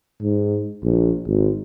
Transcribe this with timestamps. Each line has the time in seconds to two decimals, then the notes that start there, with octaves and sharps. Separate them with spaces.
0.22 G#2
0.84 A#1
1.27 G#1